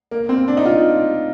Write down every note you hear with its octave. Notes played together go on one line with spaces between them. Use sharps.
A#3
C4
D4
D#4
F4